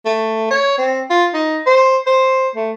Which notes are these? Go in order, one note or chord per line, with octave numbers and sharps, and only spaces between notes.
A3
C#5
C4
F4
D#4
C5
C5
A3